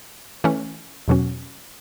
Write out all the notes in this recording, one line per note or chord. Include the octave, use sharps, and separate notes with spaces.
E3 A3 C#4
E2 B2 F#3 C#4 F#4